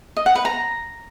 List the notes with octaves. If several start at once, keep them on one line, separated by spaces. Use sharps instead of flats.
D#5
F#5
B4
A#5